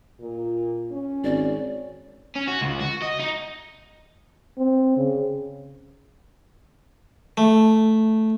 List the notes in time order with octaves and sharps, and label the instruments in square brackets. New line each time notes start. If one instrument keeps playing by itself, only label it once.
[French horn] A#2
C#4
[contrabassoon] G#1 [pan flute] D5
[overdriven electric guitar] C#4
F#4
C#2
F#4
D#5
D#4
[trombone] C4
C#3
[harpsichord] A3